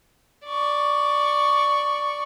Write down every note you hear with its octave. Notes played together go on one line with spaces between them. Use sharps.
D5 C#6